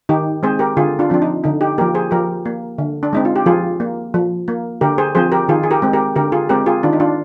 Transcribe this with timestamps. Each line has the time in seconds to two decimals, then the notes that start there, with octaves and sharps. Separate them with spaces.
0.09 D#3 D#4 G4
0.43 G#3 C4 G#4 C5
0.59 G4 A#4
0.77 D3 F4 G#4
0.99 D4 F4
1.10 F3 C4 D4
1.22 D#4
1.44 D3 D#4
1.61 D#4 G4
1.78 F3 A#3 G4 A#4
1.95 G#4 C5
2.11 F3 G4 A#4
2.46 A#3
2.78 D3
3.03 D4
3.13 G#3 C4 D#4
3.25 F4
3.36 G4
3.46 F3 F4 G#4
3.80 A#3
4.14 F3
4.48 A#3
4.81 D3 G4 A#4
4.98 G#4 C5
5.15 F3 C4 G#4 C5
5.32 G4 A#4
5.48 D#3 F4 G#4
5.63 G#4
5.71 G4 A#4
5.82 G#3 C4
5.93 G4 A#4
6.16 D3 G4 A#4
6.32 F4 G#4
6.49 G#3 C4 G4 A#4
6.66 F4 G#4
6.83 D#3 D4 F4
6.93 D#4
7.00 D4 F4